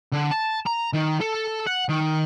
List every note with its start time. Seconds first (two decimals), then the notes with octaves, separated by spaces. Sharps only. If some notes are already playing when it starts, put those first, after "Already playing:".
0.13 D3
0.31 A5
0.67 A#5
0.94 D#3
1.21 A4
1.66 F#5
1.89 D#3